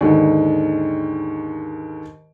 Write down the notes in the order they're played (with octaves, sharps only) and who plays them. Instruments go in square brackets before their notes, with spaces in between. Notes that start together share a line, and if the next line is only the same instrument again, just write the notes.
[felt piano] D#2 G#2 D3